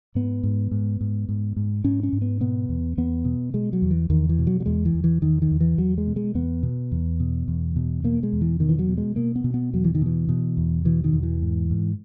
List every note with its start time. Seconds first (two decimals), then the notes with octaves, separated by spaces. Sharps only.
0.15 G#2 B3
0.43 G#2
0.71 G#2
1.01 G#2
1.29 G#2
1.57 G#2
1.84 G#2 C#4
2.03 C#4
2.13 G#2
2.22 B3
2.40 B2 B3
2.69 E2
2.97 E2 B3
3.25 B2
3.54 B2 G#3
3.73 F#3
3.82 E2
3.91 E3
4.10 E2 D#3
4.29 E3
4.39 B2
4.47 F#3
4.60 F#3
4.66 E2 G#3
4.85 E3
4.94 E2
5.04 E3
5.22 E2 D#3
5.42 D#3
5.51 E2
5.60 E3
5.78 E2 F#3
5.98 G#3
6.07 B2
6.16 G#3
6.35 E2 B3
6.63 B2
6.92 E2
7.20 B2
7.48 E2
7.76 B2
8.04 B2 A#3
8.23 G#3
8.33 E2
8.41 E3
8.60 B2 D#3
8.69 E3
8.79 F#3
8.88 B2
8.98 G#3
9.16 B2 A#3
9.36 B3
9.44 B2
9.54 B3
9.73 E2 F#3
9.84 E3
9.95 D#3
10.02 B2 E3
10.29 B2
10.57 E2
10.85 B2 E3
11.04 D#3
11.13 E2
11.23 E3
11.42 G#2
11.70 G#2